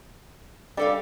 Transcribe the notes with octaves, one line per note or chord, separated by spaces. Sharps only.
G3 D4 A4 F5